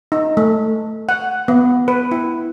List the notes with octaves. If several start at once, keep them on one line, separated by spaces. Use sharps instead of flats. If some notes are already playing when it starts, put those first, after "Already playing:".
D#4
A3
F#5
B3
B4
E4